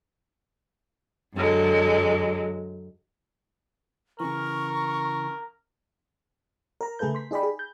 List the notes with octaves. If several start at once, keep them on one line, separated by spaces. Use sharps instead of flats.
F#2 D3 F#3 G#3
C#3 E3 A#4 C#6
A#4 A#5
C#3 A3 G#4 A4 B4 G6
C6 B6
D#4 G#4 D5 G5 B5
G#4
G6